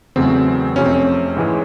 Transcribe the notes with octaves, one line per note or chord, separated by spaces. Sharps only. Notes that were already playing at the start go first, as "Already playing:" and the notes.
E2 C#3 F#3 A3 C4
F2 C3 F3 A3 C#4
C4
C#4
G#2 E3 G#3